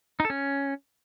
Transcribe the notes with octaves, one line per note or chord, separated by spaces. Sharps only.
D#4
A4
C#4